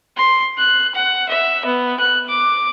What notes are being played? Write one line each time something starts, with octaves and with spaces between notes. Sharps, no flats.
C6
F#6
F#5
E5
B3
F#6
D6